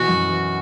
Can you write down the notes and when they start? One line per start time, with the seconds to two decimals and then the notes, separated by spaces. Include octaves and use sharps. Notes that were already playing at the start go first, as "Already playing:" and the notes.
Already playing: B2 E3 F#4
0.08 F#2
0.29 E3